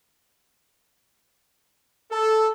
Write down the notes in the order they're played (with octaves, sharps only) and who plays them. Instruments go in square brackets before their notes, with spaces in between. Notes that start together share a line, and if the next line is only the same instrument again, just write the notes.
[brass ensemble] A4